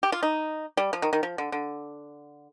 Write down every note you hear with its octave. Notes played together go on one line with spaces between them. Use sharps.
G4
F4
D#4
G3
F3
D#3
D#3
F3
D3
D3